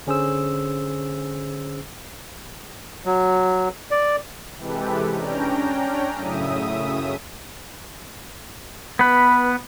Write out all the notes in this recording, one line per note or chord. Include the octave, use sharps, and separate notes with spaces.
D3 C#4 G#4 C5 E6
F#3
D5
C3 E3 G#3 G4 A4 B4
C#4 D4 G5 A#5
F#2 A2 C#3 E5 D#6
B3 B4